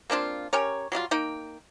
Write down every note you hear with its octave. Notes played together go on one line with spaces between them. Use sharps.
A#3 C4 D4 F4
C#4 G4 A#4 C#5
F#3 G3 E4 F4
A#3 D#4 G5